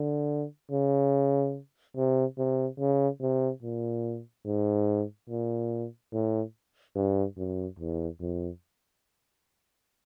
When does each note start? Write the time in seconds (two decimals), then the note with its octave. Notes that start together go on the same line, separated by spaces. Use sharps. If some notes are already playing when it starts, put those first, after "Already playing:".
Already playing: D3
0.71 C#3
1.96 C3
2.38 C3
2.79 C#3
3.21 C3
3.62 A#2
4.45 G#2
5.29 A#2
6.13 A2
6.95 G2
7.37 F#2
7.79 E2
8.20 F2